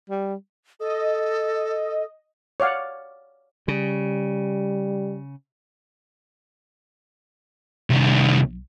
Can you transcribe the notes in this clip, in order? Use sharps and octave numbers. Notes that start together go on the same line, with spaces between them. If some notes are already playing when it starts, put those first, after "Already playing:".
G3
A4 D#5
C#5 D5 F5 F#5
C#3 G3
C2 D#3